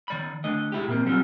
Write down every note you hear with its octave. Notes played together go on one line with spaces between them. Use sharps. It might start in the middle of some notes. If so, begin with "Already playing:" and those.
D#3 D5 B5
D3 A3 D#5
G#3 E4 G4
A#2 A#3 C4
F#3 G3 C4 C#4 F4